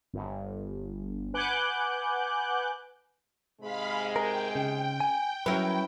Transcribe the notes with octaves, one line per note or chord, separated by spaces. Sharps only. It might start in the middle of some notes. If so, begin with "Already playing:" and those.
G1
B4 F#5 G#5 D6 F#6 G6
G#2 C3 G#3 F5 B5
A#4 G5
C#3
G#5
F#3 C#4 E4 A#4 B4